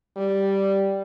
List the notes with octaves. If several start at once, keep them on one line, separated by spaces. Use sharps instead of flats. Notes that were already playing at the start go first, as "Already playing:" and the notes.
G3